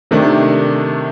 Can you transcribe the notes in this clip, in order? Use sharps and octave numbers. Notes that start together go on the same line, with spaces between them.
C3 D#3 A3 D4